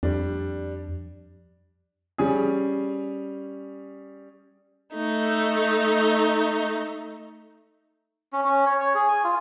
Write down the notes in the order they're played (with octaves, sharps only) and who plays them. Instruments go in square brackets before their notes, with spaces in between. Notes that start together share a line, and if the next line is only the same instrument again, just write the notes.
[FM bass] F2 [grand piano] G3 D4
[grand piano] G3 C#4 G#4
[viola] A3 D#4
[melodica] C#4
C#4
C#5
C#5
G#4
G#5
F4